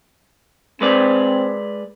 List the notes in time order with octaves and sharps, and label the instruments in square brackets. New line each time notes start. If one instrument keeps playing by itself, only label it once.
[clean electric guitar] G#3 B4 D5 [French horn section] C4